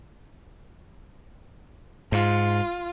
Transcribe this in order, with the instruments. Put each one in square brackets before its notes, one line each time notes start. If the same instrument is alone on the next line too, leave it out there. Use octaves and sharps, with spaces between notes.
[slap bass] G#2 [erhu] F4